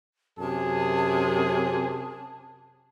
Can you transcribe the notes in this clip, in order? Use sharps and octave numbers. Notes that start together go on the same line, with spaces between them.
F#2 C3 G#4 A5